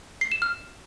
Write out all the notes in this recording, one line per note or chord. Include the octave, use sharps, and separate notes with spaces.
C7
E7
F6